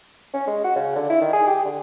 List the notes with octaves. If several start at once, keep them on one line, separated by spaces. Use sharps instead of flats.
C#4
G#3
F#4
C#3
D3
E4
D#3
G#4
G4
D3